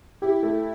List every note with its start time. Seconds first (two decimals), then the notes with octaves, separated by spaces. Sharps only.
0.22 E4 G4
0.43 A3